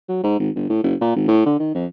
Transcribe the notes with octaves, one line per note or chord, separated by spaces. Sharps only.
F#3
G#2
G#1
G1
A2
F#1
A#2
G#1
A2
D3
D#3
F2